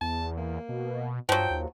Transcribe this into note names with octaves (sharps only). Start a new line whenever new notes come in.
E2 A5
A#3
B2
G2 F3 F#3 G5
D#2